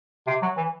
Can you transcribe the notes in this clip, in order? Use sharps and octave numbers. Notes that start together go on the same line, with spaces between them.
C3
F#3
E3